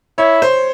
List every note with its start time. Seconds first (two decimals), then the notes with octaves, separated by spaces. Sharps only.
0.18 E4 C#5
0.42 C5